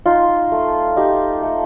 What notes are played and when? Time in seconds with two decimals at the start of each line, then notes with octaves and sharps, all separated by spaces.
0.06 D#4 F4
0.52 A3
0.97 D#4 G4
1.43 A3